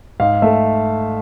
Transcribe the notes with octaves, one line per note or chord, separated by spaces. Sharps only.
G#2 F5
A3 E5